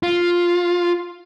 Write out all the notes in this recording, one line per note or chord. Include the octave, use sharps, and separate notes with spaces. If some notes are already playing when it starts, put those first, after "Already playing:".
F4